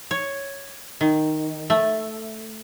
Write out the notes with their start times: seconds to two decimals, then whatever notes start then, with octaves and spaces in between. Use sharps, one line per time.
0.11 C#5
1.01 D#3
1.70 A3